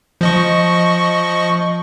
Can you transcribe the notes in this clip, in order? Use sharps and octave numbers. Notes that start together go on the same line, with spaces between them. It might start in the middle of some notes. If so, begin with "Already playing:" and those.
F3 D#5 C#6